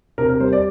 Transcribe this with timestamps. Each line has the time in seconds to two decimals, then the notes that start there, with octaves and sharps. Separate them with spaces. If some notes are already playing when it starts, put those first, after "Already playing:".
0.18 C3 A#4
0.29 A#4
0.40 G3 C5
0.53 D5